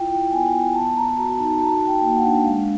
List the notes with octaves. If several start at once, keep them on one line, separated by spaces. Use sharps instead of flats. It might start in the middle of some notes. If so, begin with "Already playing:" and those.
Already playing: E4 F4 G5
E4
B3 G#5
B3
B3 A5
B3 A#5
F#4 A#5
D#4 A5
F#4 A5
F#4
G5
A#3
F#5
D4
G#3 F5